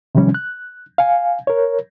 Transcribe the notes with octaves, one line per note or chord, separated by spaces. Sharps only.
C3 D#3 F3 G3 C#4
F#6
F5 G#5
A#4 C#5